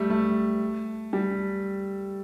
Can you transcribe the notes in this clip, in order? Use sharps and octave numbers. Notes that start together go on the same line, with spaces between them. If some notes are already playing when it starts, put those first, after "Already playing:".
Already playing: G3 A3
A3
G3